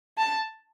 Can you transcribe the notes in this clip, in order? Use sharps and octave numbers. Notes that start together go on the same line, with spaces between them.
A5